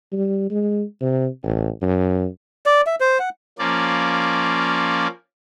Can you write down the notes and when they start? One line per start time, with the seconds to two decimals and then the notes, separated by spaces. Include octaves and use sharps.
0.13 G3
0.51 G#3
1.01 C3
1.43 A1
1.82 F#2
2.66 D5
2.87 E5
3.00 C5
3.19 F#5
3.59 F3 A#3 C#4 D5